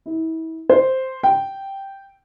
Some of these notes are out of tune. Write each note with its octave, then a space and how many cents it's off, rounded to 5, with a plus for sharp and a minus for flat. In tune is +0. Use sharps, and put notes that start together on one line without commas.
E4 -35
C5 +0
G5 -5